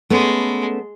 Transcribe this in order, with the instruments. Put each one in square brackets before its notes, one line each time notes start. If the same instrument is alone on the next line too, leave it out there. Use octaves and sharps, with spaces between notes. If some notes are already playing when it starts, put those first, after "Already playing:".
[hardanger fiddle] G#3 [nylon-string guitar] A3 B3 C#4